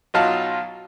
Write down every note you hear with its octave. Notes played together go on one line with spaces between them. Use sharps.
B1 F#3 D#4 F4 F5 A5